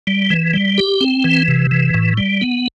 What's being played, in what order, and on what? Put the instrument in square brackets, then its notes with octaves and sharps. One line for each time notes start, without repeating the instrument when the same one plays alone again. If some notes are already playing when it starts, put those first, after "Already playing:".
[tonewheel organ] G3
E3
G3
G4
C4
E3
C3
E3
A2
G3
B3